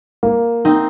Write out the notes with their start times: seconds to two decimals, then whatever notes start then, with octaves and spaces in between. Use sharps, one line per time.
0.23 A#3
0.65 C4 D#4